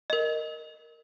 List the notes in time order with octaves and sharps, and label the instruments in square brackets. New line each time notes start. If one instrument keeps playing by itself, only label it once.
[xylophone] A#4 D#5